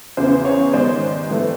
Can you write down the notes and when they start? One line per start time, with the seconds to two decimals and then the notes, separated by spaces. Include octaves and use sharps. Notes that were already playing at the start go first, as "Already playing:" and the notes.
0.17 E2 C#3 E3 C5
0.45 C#5
0.73 G#2 D#3 G3 B3 C5 D5
1.30 A2 E3 A3